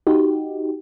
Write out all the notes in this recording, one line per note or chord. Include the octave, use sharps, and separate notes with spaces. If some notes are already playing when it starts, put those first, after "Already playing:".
D#4 F#4 G4